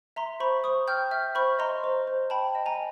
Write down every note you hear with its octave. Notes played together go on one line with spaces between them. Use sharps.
E5 A#5 C6
C5 B5 C#6
C5 C#6 D#6
G5 F6 G6
E5 F6 G6
C5 B5 C#6
D#5 A#5 C6
C5
C5
G5 A5 B5
D#5
G#5 A#5